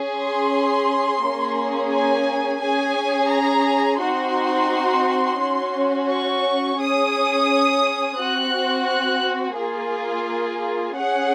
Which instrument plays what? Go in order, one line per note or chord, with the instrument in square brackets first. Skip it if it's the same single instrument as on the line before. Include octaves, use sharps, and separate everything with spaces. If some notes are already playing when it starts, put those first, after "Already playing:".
Already playing: [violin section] C#4 G#4
C6
A#3 C#4 G#4
G#5
C#4 G#4 G#5
A#5
C4 D#4 F#4 C6
C#4 F#4
C#6
C#4 G#4 D#6
C4 F#4 F#6
F#6
A#3 F4 G#4
C#4 G#4 F#5